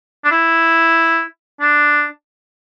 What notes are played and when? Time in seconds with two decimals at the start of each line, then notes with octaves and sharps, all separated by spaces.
0.25 D4
0.31 E4
1.61 D4